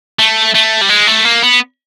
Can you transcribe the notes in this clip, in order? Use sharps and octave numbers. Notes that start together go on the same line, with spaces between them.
A3
A3
G3
G#3
A3
A#3
B3